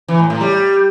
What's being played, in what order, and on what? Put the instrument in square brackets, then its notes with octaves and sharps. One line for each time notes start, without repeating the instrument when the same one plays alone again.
[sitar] E3
A2
A2
G3